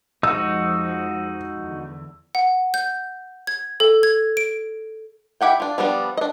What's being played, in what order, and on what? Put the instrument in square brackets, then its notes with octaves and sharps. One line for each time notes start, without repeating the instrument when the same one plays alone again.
[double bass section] F2 F3 G#3 [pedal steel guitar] D#4 F#4 [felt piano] E6
[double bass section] E2 D3
[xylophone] F#5
G6
G#6
A4
G#6
D7
[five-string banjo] E4 G4 F#5 G5
D4 F4
F3 G3 B3 D4
D4 D#5